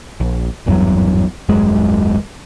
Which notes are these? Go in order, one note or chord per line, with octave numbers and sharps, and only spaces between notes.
A#1
G#1 E2 G2 F#3
D#1 G#1 F#2 G#3